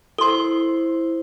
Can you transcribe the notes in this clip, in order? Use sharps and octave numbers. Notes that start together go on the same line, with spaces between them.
E4 A4 C5 C6